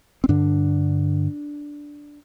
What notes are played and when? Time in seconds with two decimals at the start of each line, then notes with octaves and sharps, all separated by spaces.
0.24 C4
0.29 G2 D3 D4